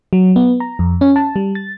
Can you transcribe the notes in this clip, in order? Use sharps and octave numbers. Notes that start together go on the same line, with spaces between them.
F#3
B3
A#5
F2
C#4
A5
G3
A6